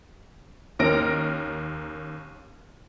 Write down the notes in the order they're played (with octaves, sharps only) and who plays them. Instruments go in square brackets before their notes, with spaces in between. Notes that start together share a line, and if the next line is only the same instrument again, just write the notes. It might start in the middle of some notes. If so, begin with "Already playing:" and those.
[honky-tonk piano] D#2 C#4 A#4 F6 A#6 D7